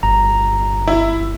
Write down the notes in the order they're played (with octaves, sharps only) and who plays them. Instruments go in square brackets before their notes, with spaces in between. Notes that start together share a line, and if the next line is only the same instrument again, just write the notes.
[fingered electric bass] G1 [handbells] A#5
[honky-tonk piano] E4